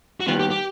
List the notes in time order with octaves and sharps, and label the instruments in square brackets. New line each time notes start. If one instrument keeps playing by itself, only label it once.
[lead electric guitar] F#4
[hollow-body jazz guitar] D#2 D#3 G3 B3 [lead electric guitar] F4
[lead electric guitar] G4
G4